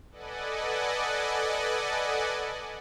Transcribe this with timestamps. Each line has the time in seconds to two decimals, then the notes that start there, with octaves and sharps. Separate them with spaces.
0.11 A4 B4 D5 D#5 F#5 G#5